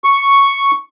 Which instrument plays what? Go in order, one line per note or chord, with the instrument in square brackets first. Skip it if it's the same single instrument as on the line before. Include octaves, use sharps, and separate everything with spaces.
[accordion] C#6